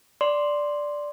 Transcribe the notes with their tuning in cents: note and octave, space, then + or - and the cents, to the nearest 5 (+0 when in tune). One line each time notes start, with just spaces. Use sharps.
D5 +0 C6 +0